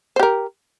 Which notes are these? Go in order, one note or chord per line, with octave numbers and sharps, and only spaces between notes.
G4 A#4 C5